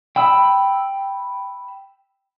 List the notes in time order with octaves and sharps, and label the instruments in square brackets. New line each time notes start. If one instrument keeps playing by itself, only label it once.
[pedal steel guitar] G5 B5 E6